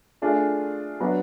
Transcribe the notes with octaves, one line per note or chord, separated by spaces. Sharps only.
A3 D4 F4 G#4
F#3 B3 D4